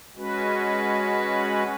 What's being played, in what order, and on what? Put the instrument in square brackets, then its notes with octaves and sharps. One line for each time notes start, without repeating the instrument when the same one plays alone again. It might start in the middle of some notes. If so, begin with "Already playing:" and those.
[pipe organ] G#3 C#4 F#4 B4